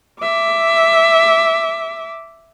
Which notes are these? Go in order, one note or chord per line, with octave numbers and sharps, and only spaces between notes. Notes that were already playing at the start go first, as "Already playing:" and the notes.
E5 D6